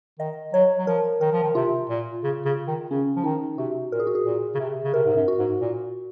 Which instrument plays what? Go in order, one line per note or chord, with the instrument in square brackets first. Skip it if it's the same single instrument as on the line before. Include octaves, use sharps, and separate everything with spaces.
[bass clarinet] D#3 [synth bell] D#5
[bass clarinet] F#3 [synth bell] C#5
[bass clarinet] F#3
[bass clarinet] F3 [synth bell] A#4
[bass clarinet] D#3 [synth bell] A#4
[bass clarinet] F3
D#3
[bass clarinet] C3 [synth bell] F4
[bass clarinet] A#2
C#3
C#3
D#3
[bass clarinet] C#3 [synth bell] C#4
[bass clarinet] F3
[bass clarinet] D#3 [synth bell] D#4
[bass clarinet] C3 [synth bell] F#4
[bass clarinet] A#2 [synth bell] A#4
[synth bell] G#4
F#4
G#4
[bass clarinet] A#2
C#3
C3
C#3
[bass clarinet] C3 [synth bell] A#4
[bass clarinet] G#2
F#2
[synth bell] F#4
[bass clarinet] G#2
A#2